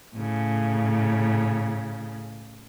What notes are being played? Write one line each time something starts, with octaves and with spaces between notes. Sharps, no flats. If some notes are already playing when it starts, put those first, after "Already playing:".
A2 C#3